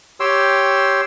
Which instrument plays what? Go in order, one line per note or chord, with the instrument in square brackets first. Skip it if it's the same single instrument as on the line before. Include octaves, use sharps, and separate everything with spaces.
[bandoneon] G4 C#5 G5 C6 E6